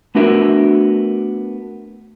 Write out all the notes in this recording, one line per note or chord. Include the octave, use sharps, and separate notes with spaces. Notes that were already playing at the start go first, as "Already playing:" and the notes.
A3 B3 D4 F#4 A#4 E5